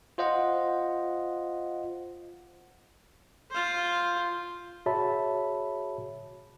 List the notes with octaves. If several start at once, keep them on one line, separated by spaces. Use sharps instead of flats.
F4 C5 D#5 F#5
F4 C5
F#4 G#4 C#5 E5 A5 B5